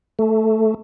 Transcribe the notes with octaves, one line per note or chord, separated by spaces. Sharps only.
A3